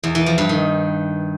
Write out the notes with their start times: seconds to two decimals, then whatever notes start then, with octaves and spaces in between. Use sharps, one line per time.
0.04 E2
0.15 E3
0.26 F3
0.38 G2
0.49 D#3